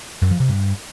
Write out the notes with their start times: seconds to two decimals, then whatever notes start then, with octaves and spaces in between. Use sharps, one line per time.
0.22 F#2
0.31 F3
0.40 C3
0.49 G2